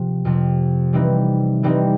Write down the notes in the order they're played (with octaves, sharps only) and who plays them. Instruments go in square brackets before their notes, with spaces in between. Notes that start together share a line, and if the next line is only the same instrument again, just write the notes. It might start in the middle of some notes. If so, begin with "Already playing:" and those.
Already playing: [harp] C3 F3
F2 C3 F3
E3 G3 C4 D#4
E3 G3 C4 D#4